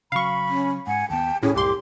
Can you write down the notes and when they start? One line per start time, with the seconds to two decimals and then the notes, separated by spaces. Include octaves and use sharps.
0.12 C#3 F#3 F5 B5 C#6
0.48 C#4
0.87 G#2 F#5 G#5
1.10 D#2 B3 G5 A5
1.43 D#1 A2 C#4 G#4
1.56 C2 F#2 A2 G4 C6 D6